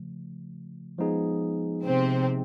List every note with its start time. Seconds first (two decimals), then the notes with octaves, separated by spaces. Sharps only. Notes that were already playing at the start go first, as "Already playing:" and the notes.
Already playing: C#3 F3 A3
0.98 F3 G#3 B3 D#4 G#4
1.84 C3 C4